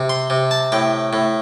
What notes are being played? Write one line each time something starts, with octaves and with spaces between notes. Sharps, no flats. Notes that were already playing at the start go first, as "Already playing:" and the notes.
Already playing: C3
C6
C3
A5
A2 G5
A2